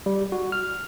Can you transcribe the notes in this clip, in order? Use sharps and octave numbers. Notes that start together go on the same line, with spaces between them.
G3
F#4
F6